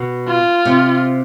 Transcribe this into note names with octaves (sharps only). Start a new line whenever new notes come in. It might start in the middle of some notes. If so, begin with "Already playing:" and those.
Already playing: B2
F4
C3